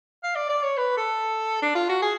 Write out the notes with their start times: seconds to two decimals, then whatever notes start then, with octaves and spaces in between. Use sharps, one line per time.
0.24 F5
0.35 D5
0.49 D5
0.63 C#5
0.77 B4
0.97 A4
1.62 D4
1.75 F4
1.89 F#4
2.02 G#4